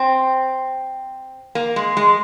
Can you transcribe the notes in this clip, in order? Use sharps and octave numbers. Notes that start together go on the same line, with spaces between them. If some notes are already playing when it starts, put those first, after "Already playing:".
Already playing: C4
A#3
G#3
G#3